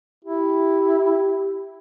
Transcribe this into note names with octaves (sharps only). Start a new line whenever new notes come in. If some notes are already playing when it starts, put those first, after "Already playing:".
E4 G4